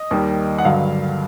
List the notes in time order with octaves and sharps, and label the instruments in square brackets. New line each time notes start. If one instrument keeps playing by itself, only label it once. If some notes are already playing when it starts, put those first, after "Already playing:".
Already playing: [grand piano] D#5
D#2 D#3 G3
F#5
G2 D3 F#3 F5